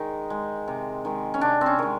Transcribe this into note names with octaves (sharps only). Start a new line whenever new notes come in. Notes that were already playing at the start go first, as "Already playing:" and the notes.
Already playing: D#3 G#3 D#4
G#3
C3
D#3 G#3
C#4
C3 D4
C4
C#4
D#3 G#3